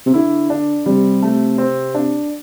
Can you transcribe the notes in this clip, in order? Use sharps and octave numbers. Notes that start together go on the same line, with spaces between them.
C3
D3 E4
D4
C3 G3
A3
C4
D4